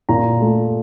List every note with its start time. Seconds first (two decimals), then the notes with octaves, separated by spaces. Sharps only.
0.09 A#2 A#5
0.41 A3